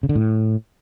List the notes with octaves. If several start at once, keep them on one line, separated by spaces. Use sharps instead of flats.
C#3
D3
A2